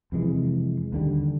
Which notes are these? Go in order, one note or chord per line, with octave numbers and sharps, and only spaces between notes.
F2 C3 E3 G#3
D#2 D3 G3